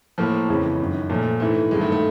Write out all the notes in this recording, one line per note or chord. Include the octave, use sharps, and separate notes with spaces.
A2 F3 A#3
F2 C#3 E3 G#3
F#2 D#3
A#2 F3 A3
G#2 E3 A3
G2 D#3 G#3
A3
A3